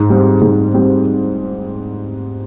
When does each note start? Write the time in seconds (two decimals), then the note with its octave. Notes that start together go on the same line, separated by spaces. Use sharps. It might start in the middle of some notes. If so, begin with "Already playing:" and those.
Already playing: G#2
0.10 G3 C4
0.41 G#2
0.74 G3 C4